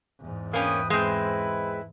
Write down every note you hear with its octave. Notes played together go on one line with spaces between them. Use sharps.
E2 G#2
A#3 C#4 B4 G5 D#6
G#3 C4 E4 B4